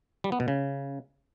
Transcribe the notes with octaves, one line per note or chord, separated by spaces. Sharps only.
G3
B3
B2
C#3